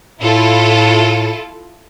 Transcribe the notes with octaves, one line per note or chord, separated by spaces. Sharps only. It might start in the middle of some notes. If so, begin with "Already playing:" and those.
A2 E4 F4 A4